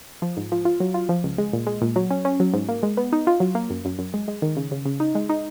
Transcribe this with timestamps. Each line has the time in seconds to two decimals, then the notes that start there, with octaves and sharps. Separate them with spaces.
0.22 F3
0.37 G#2
0.52 F3
0.65 F4
0.80 F#3
0.94 F4
1.09 F3
1.24 C#2
1.38 G#3
1.53 A#2
1.67 G#3
1.81 A#2
1.96 F#3
2.10 C#4
2.25 C#4
2.40 F#3
2.53 G#2
2.69 A#3
2.83 G#3
2.97 B3
3.13 D#4
3.27 F4
3.40 F#3
3.55 A#3
3.70 F#2
3.85 F#2
3.99 F#2
4.14 G#3
4.28 G#3
4.42 D#3
4.56 C#3
4.71 C#3
4.85 C#3
5.00 D#4
5.15 G#3
5.29 D#4